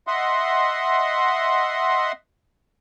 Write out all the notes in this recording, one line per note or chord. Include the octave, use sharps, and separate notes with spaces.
D#5 E5 F#5 C6